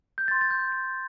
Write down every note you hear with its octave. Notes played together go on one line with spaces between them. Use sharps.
G6
C6 G6 A6
A6
G6
A6